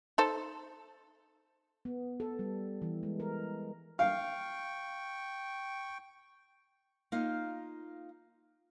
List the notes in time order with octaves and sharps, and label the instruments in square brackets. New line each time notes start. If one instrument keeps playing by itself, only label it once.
[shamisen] D#4 A4 C5
[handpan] B3
A4
G3
E3
G#3
A#4
[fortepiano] F5 [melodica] G5 C#6
[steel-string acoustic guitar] A#3 D#4 F4 F5